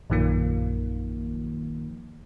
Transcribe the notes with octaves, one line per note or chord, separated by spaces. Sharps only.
A#1 F#2 D#3 F3 A#3